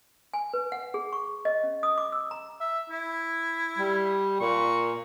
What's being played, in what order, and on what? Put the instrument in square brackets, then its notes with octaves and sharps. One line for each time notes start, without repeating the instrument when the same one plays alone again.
[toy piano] G#5
B4
F#5
G#4
C#6
D#5
C#4
D#6
D6
E6
A#5
[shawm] E5
E4
[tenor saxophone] G3
[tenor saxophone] A#2 [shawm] C#6